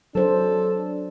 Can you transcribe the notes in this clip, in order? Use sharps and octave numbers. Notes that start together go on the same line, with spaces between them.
F#3 D4 A4 C5